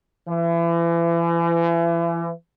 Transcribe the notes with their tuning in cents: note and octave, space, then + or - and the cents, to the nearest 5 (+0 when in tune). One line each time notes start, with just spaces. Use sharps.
E3 +35